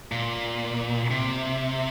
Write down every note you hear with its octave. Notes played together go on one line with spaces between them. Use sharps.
A#2
C3